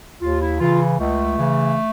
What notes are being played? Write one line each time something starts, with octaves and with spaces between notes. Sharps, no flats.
D#2 F4
E4
C#3 E3 F4
C#2 A3
C#3 E3